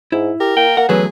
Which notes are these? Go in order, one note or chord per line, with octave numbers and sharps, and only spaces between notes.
G#2 E4
G4 A#4
A#3 G5
A#3 F#5
E2 F#3 A3 C#4 G#4 B4